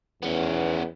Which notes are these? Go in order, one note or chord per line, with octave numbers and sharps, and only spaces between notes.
E2 B3 C#4